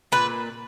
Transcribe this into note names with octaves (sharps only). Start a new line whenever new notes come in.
A#2 B4